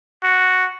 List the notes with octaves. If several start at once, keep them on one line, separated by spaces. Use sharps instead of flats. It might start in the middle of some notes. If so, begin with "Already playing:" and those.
F#4